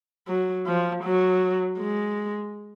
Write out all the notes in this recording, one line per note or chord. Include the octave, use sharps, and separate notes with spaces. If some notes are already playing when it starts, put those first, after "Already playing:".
F#3
F3
F#3
G#3